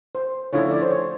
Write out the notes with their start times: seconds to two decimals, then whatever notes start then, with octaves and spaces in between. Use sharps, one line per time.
0.15 C5
0.53 D3 F3 A3 C#4 E4 C#5
0.71 D5
0.82 C5
0.90 C#5